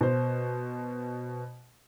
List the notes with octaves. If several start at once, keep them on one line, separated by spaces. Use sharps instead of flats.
B2 C5